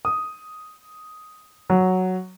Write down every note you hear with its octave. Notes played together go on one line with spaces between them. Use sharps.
D#6
F#3